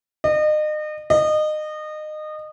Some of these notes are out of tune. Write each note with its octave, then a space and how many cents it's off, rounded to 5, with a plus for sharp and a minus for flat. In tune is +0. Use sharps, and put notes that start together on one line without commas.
D#5 -35
D#5 -25